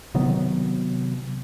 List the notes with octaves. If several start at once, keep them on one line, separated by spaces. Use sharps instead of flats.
C3 D#3 F#3 B3